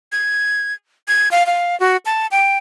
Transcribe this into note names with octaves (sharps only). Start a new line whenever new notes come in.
G#6
G#6
F5
F5
F#4
A5
G5